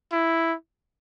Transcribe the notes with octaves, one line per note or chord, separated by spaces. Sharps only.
E4